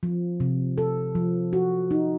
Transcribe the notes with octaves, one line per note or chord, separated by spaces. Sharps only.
F3
C3
A4
F3
F#4
D#4